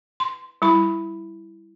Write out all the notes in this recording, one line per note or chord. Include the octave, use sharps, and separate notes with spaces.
C6
G3 E4 B5